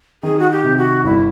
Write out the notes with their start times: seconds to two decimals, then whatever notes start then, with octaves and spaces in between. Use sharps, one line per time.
0.23 D#3 G#4
0.39 F#4
0.51 G4
0.64 C3
0.77 F#4
1.04 G1 E4